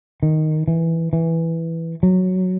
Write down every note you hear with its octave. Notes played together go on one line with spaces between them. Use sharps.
D#3
E3
E3
F#3